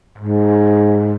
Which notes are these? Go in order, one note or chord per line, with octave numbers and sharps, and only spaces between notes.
G#2